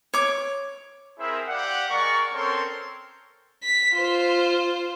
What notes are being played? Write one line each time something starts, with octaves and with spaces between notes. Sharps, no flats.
C#5 D6
C4 E4 G#4 A#4 C5 E5
G4 D5 F5 F#5
G#3 A#4 D5 C#6
C4 C#4 A4 A#4 C#5 C6
B6
F4 C5